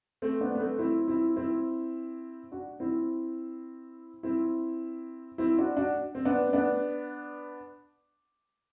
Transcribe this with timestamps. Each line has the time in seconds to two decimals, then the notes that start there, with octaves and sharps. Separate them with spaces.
0.22 A3 C4
0.41 B3 D4
0.55 B3
0.60 A3 C4
0.79 C4 E4
1.07 C4 E4
1.36 C4 E4
2.52 D4 F#4
2.80 C4 E4
4.23 C4 E4
5.38 C4 E4
5.58 D4 F#4
5.77 D4 F#4
6.15 C4
6.25 B3 D4
6.53 B3 D4